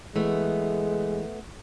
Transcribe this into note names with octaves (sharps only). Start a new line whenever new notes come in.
E3 G#3 A3 B3